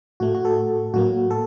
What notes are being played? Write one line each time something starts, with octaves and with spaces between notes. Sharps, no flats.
A2 A3 F#4
F#4
A4
A2 F#3 A#3 F#4
A4